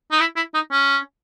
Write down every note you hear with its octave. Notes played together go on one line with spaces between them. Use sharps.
D#4
E4
E4
D#4
C#4